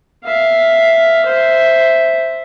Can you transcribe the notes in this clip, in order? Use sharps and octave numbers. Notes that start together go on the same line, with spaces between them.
E5 F5
C5 E5